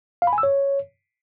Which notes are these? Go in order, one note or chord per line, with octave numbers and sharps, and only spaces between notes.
F5
B5
G#5
E6
C#5